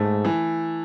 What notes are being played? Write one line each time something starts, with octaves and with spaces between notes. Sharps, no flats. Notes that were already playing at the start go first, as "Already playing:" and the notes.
Already playing: G#2 A3
E3